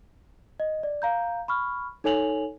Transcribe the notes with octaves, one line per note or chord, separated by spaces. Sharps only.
D#5
D5
F5 A#5 G6
B5 C#6 F6
D#4 A4 C#5 G#5 F7 F#7